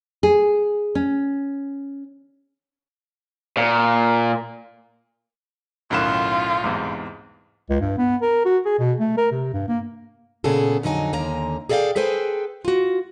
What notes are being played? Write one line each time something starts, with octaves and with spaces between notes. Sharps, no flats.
G#4
C#4
A#2
B1 F#2 A2 D#3 F4 F#6 E7
E2 G#2 C3
C#2
G2
B3
A#4
F#4
G#4
B2
A3
A#4
C3
G2
A#3
A#2 C#3 B3 G#4 A4
F2 D3 F#3 D#4 G#5
D#2 D3 A#3 G#5 A#5
G#4 A4 D5 D#5 F5 G5
G#4 A4 B4 C5 G5 G#5
F4 F#4